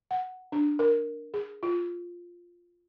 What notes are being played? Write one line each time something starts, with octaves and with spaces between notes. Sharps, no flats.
F#5
D4
A#4
G#4
F4